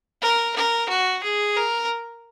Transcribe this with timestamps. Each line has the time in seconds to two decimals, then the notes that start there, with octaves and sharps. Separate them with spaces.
0.22 A#4
0.56 A#4
0.89 F#4
1.23 G#4
1.57 A#4